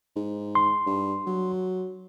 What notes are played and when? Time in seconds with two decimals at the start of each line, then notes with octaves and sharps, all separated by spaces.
0.16 G#2
0.55 C6
0.86 G2
1.26 F#3